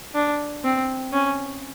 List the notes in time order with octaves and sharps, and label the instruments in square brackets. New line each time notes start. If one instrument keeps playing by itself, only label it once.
[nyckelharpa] D4
C4
C#4